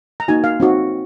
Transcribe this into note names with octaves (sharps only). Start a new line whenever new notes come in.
A#5
A#3 D#4 F#4 G#5
F5
C4 D#4 F#4